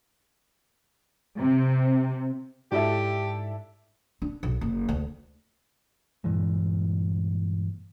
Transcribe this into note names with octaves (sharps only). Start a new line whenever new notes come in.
C3
G#2 D4 E4 F#4 G4 A4 D#5 E5
D4
B1
F#1
D2
G2 A#2 E3 G#3